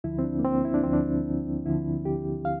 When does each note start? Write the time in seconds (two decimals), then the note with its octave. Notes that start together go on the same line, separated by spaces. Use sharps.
0.04 D2 D3 F3 E4
0.19 C4
0.24 D4
0.39 A#3
0.45 C4
0.65 E4
0.74 D4
0.84 D2 D3 F3 C4
0.93 D4
1.65 D2 D3 F3 E4
2.05 G4
2.45 F5